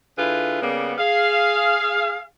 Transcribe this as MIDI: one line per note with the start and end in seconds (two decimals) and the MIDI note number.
0.18 0.60 50
0.18 0.60 64
0.18 0.60 65
0.18 0.60 68
0.18 0.60 71
0.61 0.94 49
0.61 0.94 55
0.61 0.94 58
0.61 0.94 59
0.98 2.24 68
0.98 2.24 77